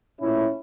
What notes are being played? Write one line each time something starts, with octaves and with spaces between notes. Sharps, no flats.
A#2 A3 C#4 E4